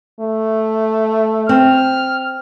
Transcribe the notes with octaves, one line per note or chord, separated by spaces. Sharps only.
A3
C4 F6